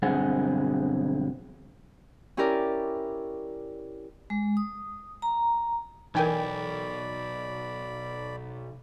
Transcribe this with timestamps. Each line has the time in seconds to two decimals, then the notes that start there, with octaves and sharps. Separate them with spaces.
0.02 B1 G2 D3 C4 G#4 F#5
2.37 C#4 E4 G4 A#4 D5
4.30 G#3
4.57 D#6
5.22 A#5
6.15 B1 E3 D#4 A#4 D5 G5 G#5 B5